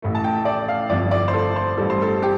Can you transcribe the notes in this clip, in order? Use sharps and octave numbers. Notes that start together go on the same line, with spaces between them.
A1 A2 A3
A5
G5
D5
F5
G1 F2 F3 D5
D5
C5
A4
C5
A1 G2 G3 A4
C5
A4
G4